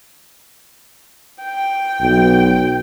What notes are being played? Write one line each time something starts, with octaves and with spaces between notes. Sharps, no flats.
G5
B1